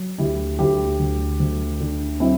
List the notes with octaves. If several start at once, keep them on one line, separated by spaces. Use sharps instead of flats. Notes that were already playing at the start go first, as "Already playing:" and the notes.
Already playing: F#3
D2 E4 G4
D2 E4 G4
D2
D2
D3
F#3 C4 E4